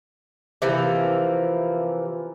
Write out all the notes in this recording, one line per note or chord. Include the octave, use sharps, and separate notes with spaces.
C3 E3 F3 A#3